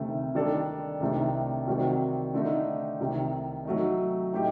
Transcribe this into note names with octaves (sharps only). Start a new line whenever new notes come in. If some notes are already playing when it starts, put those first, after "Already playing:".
Already playing: D2 C3 D#3 A3
D#3 G3 D4 A4 D5
C2 C3 D#3 A3 D4
C3 D#3 G3 C4 F#4
D3 A3 D#4
C2 C3 D#3
F#3 A3 D#4
A2 A3 D#4 G4